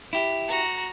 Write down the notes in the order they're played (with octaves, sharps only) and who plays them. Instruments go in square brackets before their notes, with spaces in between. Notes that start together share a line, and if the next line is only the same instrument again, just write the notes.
[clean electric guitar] E4 G4
[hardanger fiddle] F#4 A#5